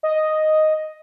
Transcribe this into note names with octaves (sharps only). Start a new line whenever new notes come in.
D#5